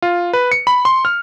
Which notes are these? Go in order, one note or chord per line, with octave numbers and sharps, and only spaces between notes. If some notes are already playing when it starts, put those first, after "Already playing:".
F4
B4
C#7
B5
C6
F6